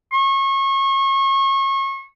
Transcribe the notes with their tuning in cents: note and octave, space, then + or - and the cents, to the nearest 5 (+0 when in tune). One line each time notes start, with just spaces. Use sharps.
C#6 -30